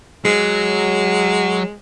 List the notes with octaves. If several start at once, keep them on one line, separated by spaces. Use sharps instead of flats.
F#3 G#3